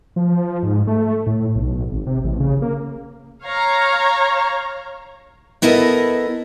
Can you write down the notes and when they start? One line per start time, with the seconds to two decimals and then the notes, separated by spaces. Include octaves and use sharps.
0.16 F3
0.63 G#2
0.87 A3
1.27 A2
1.55 B1
1.92 G#1
2.07 C3
2.24 A1
2.40 C#3
2.62 A#3
3.42 C#5 F5 A#5
5.62 B3 E4 A4 A#4 D#5